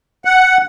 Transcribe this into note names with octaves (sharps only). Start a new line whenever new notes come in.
F#5